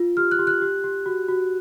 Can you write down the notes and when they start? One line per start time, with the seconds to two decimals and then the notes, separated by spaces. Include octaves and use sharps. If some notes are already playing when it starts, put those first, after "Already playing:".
Already playing: F4
0.17 G4 F6
0.31 F#6
0.39 G4
0.47 F#6
0.62 G4
0.84 G4
1.06 F#4
1.28 F#4